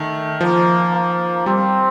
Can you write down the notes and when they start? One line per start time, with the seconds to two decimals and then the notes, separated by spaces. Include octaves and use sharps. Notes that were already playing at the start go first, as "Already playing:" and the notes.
Already playing: D#3 A3
0.41 F3 A#3
0.94 A#3
1.46 G3 C4